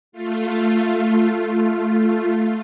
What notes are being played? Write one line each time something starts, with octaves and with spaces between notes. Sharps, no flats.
A3 F4